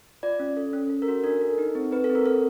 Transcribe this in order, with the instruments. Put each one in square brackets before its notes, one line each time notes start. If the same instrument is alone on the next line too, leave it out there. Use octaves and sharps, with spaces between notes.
[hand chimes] F4 D5
C#4
A4
C#4
A4
A#4
F#4
D4 A#4
A4
D#4
C4
C4 B4
A4
C4
A#4
A4